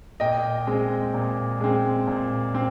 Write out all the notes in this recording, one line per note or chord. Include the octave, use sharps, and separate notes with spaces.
A#2 D#5 G5
G#3 C4
A#2
G#3 C4
A#2
C4